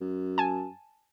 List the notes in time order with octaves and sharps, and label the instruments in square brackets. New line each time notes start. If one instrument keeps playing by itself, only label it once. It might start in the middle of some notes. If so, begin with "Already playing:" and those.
[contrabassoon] F#2
[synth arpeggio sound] G#5 A5